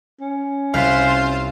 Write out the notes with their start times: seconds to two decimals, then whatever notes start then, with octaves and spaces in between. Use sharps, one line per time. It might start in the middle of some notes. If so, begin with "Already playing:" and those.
0.21 C#4
0.74 C2 F4 C5 F5 C6 F#6 B6